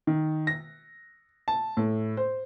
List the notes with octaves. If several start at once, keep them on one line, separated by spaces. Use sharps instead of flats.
D#3
A#6
A5
A2
C5